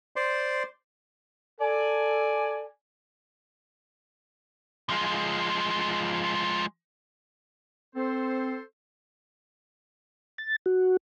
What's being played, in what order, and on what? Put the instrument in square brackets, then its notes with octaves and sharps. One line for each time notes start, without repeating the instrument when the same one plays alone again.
[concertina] C5 D5 C6
[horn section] A4 D5 G#5
[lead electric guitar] F3 G#3
[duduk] C4 [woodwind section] A4 C5
[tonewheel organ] A6
F#4